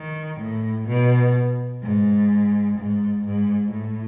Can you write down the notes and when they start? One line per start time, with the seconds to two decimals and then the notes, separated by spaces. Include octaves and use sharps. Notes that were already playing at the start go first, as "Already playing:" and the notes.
Already playing: D#3
0.40 A2
0.88 B2
1.82 G#2
2.78 G#2
3.25 G#2
3.72 A2